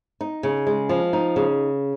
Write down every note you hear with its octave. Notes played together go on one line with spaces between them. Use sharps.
D#4
C#3
G#3
F3
D#4
C#3